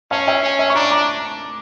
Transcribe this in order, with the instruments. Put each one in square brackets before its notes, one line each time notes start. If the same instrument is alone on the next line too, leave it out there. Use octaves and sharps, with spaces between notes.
[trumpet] C#4 [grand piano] F5 A5
[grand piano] E5 G5
[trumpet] C#4
[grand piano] E5
C#6
[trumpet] D4 [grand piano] A#5 D6
[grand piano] A#5 D6